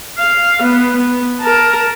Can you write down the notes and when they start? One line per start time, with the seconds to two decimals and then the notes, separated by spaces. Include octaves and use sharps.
0.18 F5
0.63 B3
0.97 B3
1.40 A#4 A5